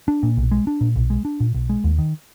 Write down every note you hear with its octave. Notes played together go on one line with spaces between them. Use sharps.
D4
A#2
B1
G#3
D4
A#2
B1
G#3
D4
A#2
B1
G#3
D#2
D#3